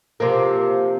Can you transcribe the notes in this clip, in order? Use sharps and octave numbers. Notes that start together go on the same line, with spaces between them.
C3 F3 A#3